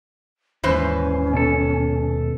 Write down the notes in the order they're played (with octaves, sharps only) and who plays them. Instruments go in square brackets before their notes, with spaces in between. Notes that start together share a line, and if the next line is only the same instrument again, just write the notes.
[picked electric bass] D#1 D#2 G#2 [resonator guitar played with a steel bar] E3 B4 C5 [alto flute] C#4
[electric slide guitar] B2 A4